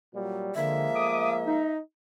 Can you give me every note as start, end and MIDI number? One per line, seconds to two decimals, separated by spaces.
0.14 0.53 46
0.14 0.53 54
0.14 0.53 55
0.55 0.87 50
0.55 1.67 53
0.55 1.67 56
0.55 1.67 58
0.55 1.70 76
0.95 1.33 57
0.95 1.33 86
0.95 1.33 87
1.46 1.79 63